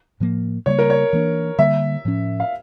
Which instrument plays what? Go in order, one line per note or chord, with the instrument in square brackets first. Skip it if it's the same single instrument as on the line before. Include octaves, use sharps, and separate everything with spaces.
[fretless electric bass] A2 F3 A#3
[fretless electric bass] C#3 G3 A#3 [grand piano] C#5
[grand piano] A#4
C#5
[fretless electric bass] E3 A#3 D4
[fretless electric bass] D3 G3 A#3 [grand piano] E5
[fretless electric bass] A2 F3 C#4
[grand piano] F5